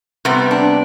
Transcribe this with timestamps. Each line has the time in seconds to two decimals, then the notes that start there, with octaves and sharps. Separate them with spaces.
0.25 C3 G3 B3 C4
0.51 D4